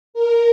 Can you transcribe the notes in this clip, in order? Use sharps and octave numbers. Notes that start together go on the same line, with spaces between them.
A#4